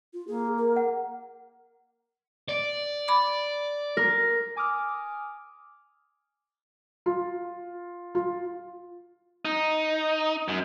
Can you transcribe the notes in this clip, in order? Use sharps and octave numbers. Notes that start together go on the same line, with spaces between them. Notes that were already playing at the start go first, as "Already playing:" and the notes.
F4
A#3 G#4
A#4
F#5
D5
B5 D6
A#4
G#5 D6 D#6 F6
F4
F4
D#4
F#2